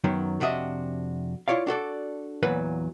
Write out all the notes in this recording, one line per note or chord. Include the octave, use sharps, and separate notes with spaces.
F#2 D#3 F#3 B3
F2 C3 D4 F#4 D#5 E5
E4 F4 C#5 D5 F5
D4 F#4 A4 D5
E2 A#2 E3 F#3 B4